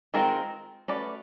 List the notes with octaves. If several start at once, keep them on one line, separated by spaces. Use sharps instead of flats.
D#3 G#3 C4 F4 A#4
A3 C#4 F#4 B4 D5